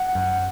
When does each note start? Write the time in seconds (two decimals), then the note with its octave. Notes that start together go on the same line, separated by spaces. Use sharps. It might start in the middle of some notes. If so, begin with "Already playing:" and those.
Already playing: F#5
0.15 F#2